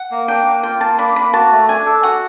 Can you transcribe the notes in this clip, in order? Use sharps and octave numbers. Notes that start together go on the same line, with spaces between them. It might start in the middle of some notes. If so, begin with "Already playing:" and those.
Already playing: F#5
A#3
D4 G5
A#3
F4 G5
A#3 A5
D4 B5
A#3 B5
F#4 A5
A3
D4 G#5
A4
F#4 F#5